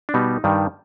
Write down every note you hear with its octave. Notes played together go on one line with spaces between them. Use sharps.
D4
B2 G3 B3 D#4
G2 D#3 G3